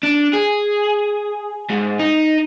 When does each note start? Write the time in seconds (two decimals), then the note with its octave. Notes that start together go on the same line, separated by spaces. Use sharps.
0.03 D4
0.33 G#4
1.70 G#2
1.99 D#4